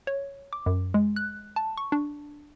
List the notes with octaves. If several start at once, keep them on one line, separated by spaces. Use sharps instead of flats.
C#5
D6
F#2
G#3
F#6
A5
C#6
D4